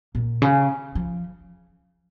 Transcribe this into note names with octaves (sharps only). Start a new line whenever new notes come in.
A#2
C#3
F3